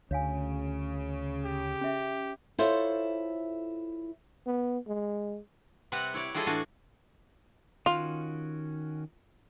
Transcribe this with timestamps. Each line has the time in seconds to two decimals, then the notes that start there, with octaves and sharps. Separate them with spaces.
0.11 D2 C#3 C#5 F5 G#5
1.46 G4
1.81 C#4 E5
2.58 E4 F4 A4 C5 C#5 E5
4.47 B3
4.88 G#3
5.92 C3 G3 C4 B4 F#5
6.14 E4 C#5 D5
6.34 G3 E4 F4 G#4 A4 D#5
6.47 A2 E3 D4 F#4 F5 G#5
7.86 D#3 C#4 F4 F#4